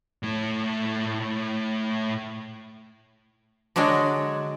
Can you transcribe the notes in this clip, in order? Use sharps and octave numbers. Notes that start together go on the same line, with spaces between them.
A2 A3
D3 F#3 G#3 D4 C#5